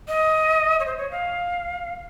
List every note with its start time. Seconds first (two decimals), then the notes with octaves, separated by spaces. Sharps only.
0.08 D#5
0.80 C#5
0.86 C5
0.98 C#5
1.11 F5